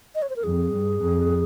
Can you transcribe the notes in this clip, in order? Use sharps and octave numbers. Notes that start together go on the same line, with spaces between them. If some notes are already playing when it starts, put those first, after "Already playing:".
D#5
C#5
C5
A#4
F2 G#4
G2
F2